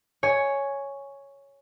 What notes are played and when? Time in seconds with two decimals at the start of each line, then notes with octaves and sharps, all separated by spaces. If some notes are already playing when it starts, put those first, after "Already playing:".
0.23 C#5 G#5